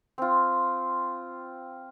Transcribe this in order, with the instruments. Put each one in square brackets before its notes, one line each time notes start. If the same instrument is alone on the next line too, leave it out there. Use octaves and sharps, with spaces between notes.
[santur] C4 F4